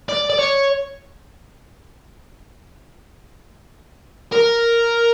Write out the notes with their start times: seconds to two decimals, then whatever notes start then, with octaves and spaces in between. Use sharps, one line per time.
0.09 D5
0.30 D5
0.39 C#5
4.32 A#4